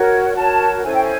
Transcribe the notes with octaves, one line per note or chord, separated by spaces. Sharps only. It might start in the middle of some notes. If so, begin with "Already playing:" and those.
Already playing: F#4 A#4 C#5
F#4 A#4 C#5 A5
C#4 E4 A4 C5 G#5
G5
G#5